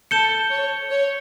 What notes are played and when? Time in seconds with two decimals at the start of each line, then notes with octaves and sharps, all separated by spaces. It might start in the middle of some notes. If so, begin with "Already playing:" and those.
0.11 A4 G6 C#7 E7 G7
0.50 C#5
0.90 C#5